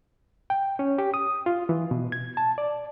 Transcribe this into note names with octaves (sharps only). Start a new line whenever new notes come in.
G5
C#4
G4
D#6
F4
E3
B2
G#6
A5
D5